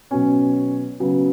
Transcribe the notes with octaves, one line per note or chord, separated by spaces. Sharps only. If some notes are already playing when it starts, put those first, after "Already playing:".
B2 F#3 B3 C#4
C#3 F#3 B3